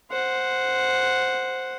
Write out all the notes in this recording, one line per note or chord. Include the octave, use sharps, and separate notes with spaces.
C5 F#5